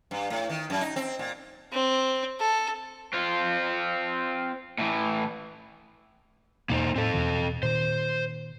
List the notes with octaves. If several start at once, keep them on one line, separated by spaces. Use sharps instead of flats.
G2
A2
D#3
F#2
D#4
C4
A#2
C4
A4
C4 F4
A2 E3
E2 B2 A#3 D#4 C5
A2 C4 A4
E2 B2 E3
A#2 D#3 C5